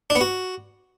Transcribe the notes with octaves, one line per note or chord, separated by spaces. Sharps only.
D4
B3
F#4